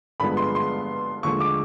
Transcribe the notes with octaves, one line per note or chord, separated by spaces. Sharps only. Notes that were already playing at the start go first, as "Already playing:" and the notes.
G2 D3 F3 G#3 B3 B5
C6
C6
D#2 D3 F3 G#3 C#6
D6